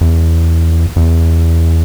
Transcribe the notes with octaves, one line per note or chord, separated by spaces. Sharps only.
E2
E2